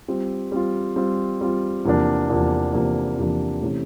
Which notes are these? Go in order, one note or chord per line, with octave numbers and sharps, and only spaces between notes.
G3 C4 F4
G3 C4 F4
G3 C4 F4
G3 C4 F4
E2 C3 F3 A#3 D4
E2 C3 F3 A#3 D4
E2 C3 F3 A#3 D4
E2 C3 F3 A#3 D4
C3 E3 A3 C#4